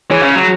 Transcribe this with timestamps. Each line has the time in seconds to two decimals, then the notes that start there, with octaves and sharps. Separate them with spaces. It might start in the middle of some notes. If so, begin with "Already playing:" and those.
0.11 E3 G#4 C#5
0.23 C#3
0.35 F#3